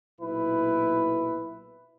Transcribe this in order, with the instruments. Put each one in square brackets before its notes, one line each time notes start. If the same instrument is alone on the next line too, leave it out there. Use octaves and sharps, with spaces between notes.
[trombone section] B1 A#2 E4 B4